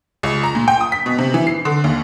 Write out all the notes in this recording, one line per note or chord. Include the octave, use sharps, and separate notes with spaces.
C#2
A#5
A#2
G5
D#6
B6
B2
C3
E3
C7
D3
D#2